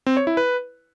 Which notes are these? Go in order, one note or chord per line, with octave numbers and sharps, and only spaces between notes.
C4
C#5
E4
B4